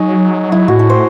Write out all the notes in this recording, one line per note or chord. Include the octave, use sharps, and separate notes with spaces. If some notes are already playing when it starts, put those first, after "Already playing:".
Already playing: F#3 D#4 G#4 C#5
E4
A2 F#4
A4
C5